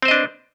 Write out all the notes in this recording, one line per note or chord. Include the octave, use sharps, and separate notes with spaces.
C4 D4 B4 C5 D#5